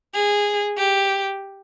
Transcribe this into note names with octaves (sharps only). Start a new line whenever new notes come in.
G#4
G4